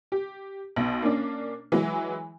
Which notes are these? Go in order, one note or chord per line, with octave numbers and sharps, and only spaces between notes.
G4
B1 B2
A#3 C#4 D4
E3 F#3 G#3